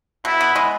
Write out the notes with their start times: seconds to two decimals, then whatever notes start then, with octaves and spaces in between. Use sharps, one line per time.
0.25 B2 E4
0.41 B3
0.56 G#3